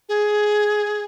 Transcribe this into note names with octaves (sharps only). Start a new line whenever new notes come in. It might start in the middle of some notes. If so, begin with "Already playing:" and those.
G#4